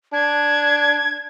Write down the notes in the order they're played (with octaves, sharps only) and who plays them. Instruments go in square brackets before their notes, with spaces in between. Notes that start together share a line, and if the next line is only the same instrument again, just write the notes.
[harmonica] D4 [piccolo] G#6